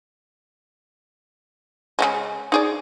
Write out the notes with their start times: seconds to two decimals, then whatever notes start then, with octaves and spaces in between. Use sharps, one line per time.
1.99 C#3 G3 G#3
2.52 D#4 G#4 D5